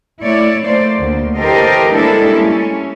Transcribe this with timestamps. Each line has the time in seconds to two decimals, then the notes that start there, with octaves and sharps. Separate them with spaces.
0.23 A3 E4 C#5 D5
0.65 A3 A#3 C5 D5
0.98 D2 A#3
1.35 E3 G4 A4 A#4 C5 D#5
1.94 G3 G#3 A#3 D4 E4 A4
2.32 C#4